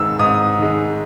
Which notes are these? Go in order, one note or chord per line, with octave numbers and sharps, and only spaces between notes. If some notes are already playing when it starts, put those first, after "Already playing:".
Already playing: G#2 D#3 G#3 E6
G#2 D#6
D#3 G#3